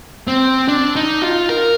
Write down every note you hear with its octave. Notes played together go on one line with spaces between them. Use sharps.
C4
D4
D#4
F4
A#4